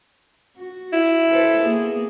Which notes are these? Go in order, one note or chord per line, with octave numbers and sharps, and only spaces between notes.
F#4
E4
A4 B4 C5
A#3 B3 G#4